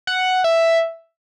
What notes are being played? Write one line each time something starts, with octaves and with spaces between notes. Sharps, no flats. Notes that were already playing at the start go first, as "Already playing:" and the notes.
F#5
E5